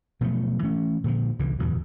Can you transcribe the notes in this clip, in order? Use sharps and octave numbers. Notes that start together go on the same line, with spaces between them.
B2 F3 F#3 A3
E3 A3 C#4
A#2 D3 E3 F3
C2 D3 E3
D1 E2 G2 B2